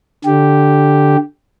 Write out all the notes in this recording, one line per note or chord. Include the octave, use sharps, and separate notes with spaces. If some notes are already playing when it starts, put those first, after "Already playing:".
D3 G4